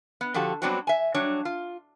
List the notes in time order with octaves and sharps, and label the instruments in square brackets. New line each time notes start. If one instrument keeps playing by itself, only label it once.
[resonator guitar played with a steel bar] B3
D3 F3 F#4 G4 A4
F#3 G3 B3 C4 D4 F#4
E5 G#5
F#3 G3 D4 C#5
F4